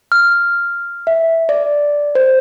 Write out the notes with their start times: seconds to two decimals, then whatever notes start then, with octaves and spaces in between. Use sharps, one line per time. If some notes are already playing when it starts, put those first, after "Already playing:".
0.12 F6
1.07 E5
1.49 D5
2.15 C5